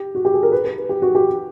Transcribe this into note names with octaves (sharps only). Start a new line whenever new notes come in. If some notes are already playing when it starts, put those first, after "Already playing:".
Already playing: G4
F#4
G4
G#4
A#4
B4
B4
G4
F#4
G4